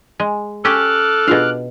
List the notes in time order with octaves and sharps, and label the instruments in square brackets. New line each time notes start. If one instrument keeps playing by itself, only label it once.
[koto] G#3
[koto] C#4 G4 [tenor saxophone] A4 [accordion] D6 F6 F#6
[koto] B2 F5 [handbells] D4 F4 G#4